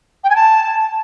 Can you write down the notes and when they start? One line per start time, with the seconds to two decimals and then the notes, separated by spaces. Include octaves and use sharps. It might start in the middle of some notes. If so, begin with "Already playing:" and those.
0.24 G5
0.30 G#5
0.36 A5